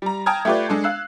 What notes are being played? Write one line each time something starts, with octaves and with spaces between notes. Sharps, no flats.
G3 A#5
G5 A5 A#5 D#6 F6 G#6
A3 F4 G4 B4 D5
G#3 D4 A4
F5 E6 F#6 C7